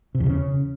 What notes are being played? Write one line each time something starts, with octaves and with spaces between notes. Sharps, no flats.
C3
E2
C#3